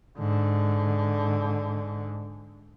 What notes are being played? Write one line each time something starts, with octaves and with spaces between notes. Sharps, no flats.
G#2 D3